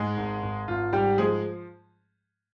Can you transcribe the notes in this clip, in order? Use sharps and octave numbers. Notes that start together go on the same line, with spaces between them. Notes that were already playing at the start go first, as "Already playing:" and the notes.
Already playing: G#2 G#3 G#4
G#1
G#1
G#1 F4
G#2 G3 G4
F3 G#3 G#4